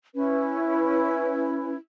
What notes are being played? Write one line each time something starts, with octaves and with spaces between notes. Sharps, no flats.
C#4 E4 B4